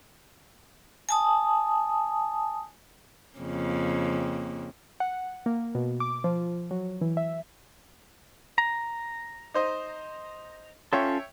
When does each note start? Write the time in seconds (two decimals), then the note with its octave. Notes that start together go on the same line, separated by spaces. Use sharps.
1.09 G#5 A5 D#6
3.36 F2 C#3 A#3
5.00 F#5
5.46 A#3
5.75 B2
6.00 D6
6.24 F3
6.71 F#3
7.01 E3
7.17 E5
8.58 A#5
9.54 D#4 C5 D#5
10.93 C#4 F4 A4 C#5 E5 G5